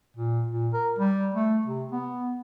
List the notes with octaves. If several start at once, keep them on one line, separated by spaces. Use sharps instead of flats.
A#2
A#2
A#4
G3
A3
C3
B3